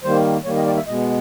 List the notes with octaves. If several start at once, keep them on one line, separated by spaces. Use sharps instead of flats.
D#3 G3 A#3 C5
D#3 G3 A#3 C#5
D#5
D5
E5
B2 G#3 B3 D#5